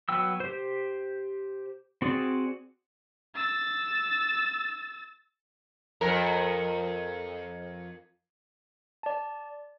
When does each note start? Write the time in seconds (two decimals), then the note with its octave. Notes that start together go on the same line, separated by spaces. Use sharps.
0.09 F#3 B3 G5 E6
0.40 G4 C5
2.02 C4 F#4 G#4 D5
3.36 E6 A6
6.01 F2 A#4
9.03 D5 A5